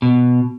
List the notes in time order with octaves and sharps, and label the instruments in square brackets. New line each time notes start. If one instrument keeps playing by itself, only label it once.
[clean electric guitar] B2